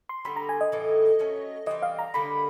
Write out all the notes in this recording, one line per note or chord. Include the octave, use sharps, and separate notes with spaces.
C6
D3 G3 B3 B5
A#5
G#5
D#5
A2 E3 A3
F#3 A3 C#4
E3 G3 C4 D#5
F5
A#5
D3 G3 A#3 D#4 B5